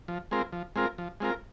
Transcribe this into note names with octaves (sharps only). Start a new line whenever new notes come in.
F3
G#3 C4 F4 A#4
F3
G#3 C4 F4 A#4
F3
G#3 C4 F4 A#4